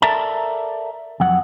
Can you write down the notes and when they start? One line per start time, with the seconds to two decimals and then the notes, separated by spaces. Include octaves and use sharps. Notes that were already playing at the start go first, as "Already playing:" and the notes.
0.02 A4 A#4 D5 E5 A5 A#5
1.20 F2 F#3 F#5